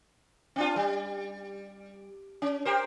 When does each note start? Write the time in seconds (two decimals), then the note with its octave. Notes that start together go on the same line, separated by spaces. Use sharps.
0.56 C4 D4 F4
0.76 G3
2.42 C#4
2.65 G4 A#4 C5